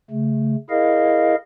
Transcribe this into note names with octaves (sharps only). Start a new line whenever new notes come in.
C#3 A3
E4 G#4 A#4 D#5 F5